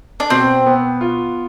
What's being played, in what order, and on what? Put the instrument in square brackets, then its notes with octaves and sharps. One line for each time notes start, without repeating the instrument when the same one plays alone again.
[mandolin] D4
[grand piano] B2 [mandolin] C4
[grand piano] B3
F4